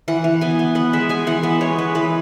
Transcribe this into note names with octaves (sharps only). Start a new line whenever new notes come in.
E3 F#5
E3
B3 G#5
B3
B3 F#5
G#3 E5
G#3 G#5
E3 F#5
B3 E5
G#3 C#5
G#3 B4
E3 B4